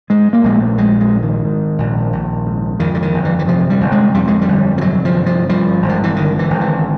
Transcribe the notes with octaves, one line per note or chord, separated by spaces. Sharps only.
G#2 G#3
A#3
A#1 G#3
A3
A#1 G#3
G#3
G#2
D#3
G#2
A#1
A#1
G#2
F2 D#3
D3
D#3
G1
E3
E3
C3 F3
G3
G1
G#3
F2 G3
G#3
G3
G1
F3
C3 F#3
F3
G1
F3
G2 F3
G#1
F3
E3
D3 D#3
E3
G#1
E3